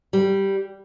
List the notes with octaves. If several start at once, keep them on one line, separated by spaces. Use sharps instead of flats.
G3